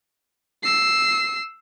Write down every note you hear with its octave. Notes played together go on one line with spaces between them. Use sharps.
E6 C7